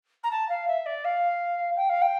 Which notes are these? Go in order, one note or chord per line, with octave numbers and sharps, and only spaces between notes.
A#5
A5
F5
E5
D5
F5
G5
F5
G5